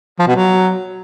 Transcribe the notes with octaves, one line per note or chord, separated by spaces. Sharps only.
F3
B2
F#3